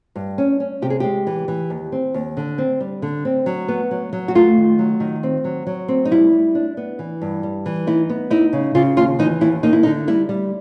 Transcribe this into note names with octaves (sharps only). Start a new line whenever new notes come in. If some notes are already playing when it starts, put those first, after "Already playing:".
G2
C#4
C#4
C3 G4
G#4
G#3 G4
E3
E3
D#2
C4
D#2
D3
C4
G3
D3
C4
F#3
B3
F#3
F#3
F#4
A3 F4
D#3
F#3
D#3
C4
F#3
F#3
C4
D#4
G3 E4
G3
D4
B3
E3
G2
G3
E3
D#4 E4
B3
D#4 E4
C#3
C#3 F4
D#2 F4
E3 D#4
D#2 E4
A#3 D#4
E4
D#4
D3
G3 E4
G3